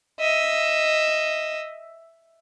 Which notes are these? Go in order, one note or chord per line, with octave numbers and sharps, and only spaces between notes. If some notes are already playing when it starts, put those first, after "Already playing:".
D#5 E5